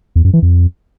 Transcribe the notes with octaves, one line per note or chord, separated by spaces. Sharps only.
E2
F#2
E3
F2